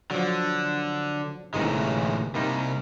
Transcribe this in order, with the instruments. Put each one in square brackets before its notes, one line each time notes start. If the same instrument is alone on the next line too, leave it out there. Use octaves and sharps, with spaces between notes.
[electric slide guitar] D3 [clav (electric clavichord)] F3 F#3
[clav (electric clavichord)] G1 C3 D#4 [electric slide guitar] A2 E3 G#3
[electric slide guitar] C3 G3 [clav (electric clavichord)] A#3 D#4